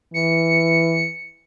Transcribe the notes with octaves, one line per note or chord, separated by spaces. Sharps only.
E3 C#7